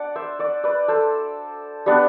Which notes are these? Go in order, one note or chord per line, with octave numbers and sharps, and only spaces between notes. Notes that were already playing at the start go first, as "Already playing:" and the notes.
Already playing: D4 D5 F#5
C5 E5
D5 F#5
B4 D5
A4 C5
G3 B3 D4